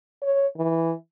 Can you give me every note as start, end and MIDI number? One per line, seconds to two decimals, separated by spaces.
0.22 0.46 73
0.57 0.92 52